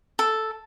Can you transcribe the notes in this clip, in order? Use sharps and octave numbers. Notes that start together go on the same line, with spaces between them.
A4